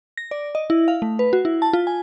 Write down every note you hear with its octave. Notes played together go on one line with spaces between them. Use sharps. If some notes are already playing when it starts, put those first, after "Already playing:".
A#6
D5
D#5
E4
F5
A3
B4
F#4
E4
A5
F4
G#5